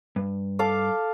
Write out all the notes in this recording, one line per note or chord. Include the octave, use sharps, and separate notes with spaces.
G2
A4 F5 D6